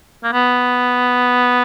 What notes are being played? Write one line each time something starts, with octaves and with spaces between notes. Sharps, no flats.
A#3
B3